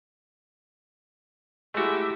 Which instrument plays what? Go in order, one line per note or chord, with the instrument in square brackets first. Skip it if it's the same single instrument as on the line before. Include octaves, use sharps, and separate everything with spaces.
[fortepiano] G#3 E4 [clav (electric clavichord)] A3 F#4 [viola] G4 E5